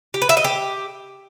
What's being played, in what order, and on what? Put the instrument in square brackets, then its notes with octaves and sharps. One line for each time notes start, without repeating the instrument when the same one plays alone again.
[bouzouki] G4
B4
E5
D#5
G4